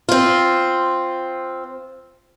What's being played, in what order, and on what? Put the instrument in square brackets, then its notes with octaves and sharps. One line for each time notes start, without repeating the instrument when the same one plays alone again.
[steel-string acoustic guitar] C4 F4